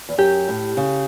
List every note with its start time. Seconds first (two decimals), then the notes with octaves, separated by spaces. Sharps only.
0.09 E2
0.18 F#2 G4
0.48 A2
0.77 C#3